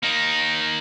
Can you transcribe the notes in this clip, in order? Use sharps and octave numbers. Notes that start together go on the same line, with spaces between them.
A#3 D#4